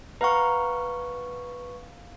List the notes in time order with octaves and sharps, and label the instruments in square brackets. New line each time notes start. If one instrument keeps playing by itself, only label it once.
[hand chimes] B4 C#6 [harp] F5 F#5 A#5